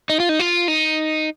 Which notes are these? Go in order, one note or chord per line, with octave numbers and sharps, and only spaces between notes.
D#4
F4
D#4
F4
D#4